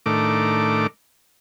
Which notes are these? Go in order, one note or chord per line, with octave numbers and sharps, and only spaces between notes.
A2 D#3 A3 D4 A#4 D6